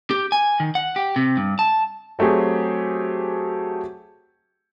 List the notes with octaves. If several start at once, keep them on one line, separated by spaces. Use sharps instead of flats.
G4
G#5
D#3
F#5
G4
C3
G2
A5
F#3 A3 C4 G4 G#4